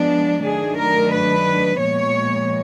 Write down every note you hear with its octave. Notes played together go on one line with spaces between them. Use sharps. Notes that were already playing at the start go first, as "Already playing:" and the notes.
Already playing: F3 G#3 B3 D4
D#3 F#3 A3 D4 G#4
A#4
B4
A#2 F3 G#3 B3 C#5